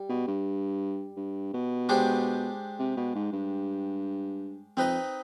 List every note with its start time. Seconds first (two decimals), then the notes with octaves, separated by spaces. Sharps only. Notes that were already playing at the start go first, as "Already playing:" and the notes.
Already playing: G3
0.09 B2
0.28 G2
1.17 G2
1.54 B2
1.89 G#3 D4 G4 C5
2.79 C3
2.97 B2
3.15 G#2
3.33 G2
4.77 F2 C4 D#4 B4 D#5